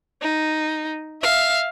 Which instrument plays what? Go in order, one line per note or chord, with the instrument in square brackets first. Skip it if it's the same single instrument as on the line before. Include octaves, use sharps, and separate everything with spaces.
[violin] D#4
E5 F5